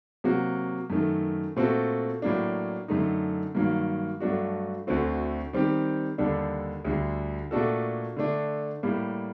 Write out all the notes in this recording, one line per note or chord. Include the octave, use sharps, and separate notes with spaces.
C3 F#3 A#3 F#4
F#2 D#3 A3
A#2 A3 C4 F#4 A4
A2 F#3 A#3 D4
F#2 D3 A3 D#4
G2 D#3 F#3 A#3
G2 F#3 A3 D4 F#4
D2 D3 A3 C4 F#4
D#3 G3 C4 G4
D#2 D3 G3 D4 A4
D2 D3 G3
A#2 A3 D4 F#4 A4
D3 A3 D4
A2 G3 A#3